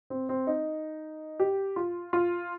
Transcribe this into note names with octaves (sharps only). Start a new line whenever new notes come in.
C4
C4
D#4
G4
F4
F4